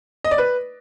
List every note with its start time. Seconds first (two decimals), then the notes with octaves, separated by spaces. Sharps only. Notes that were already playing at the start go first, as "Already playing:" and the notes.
0.24 D#5
0.31 D5
0.38 B4